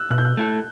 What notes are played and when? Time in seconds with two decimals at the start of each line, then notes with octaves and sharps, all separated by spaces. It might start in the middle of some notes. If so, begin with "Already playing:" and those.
Already playing: E6 F#6
0.10 B2 F#6
0.18 G6
0.25 F#6
0.37 A3 E4 A4